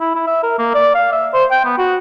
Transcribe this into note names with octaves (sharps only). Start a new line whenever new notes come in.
E4
E4
E5
A#4
A#3
D5
F5
E5
C5
G5
B3
F#4